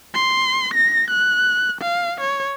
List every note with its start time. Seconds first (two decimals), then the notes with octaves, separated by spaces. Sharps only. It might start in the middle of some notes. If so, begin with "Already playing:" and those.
0.14 C6
0.74 A#6
1.11 F#6
1.82 F5
2.21 C#5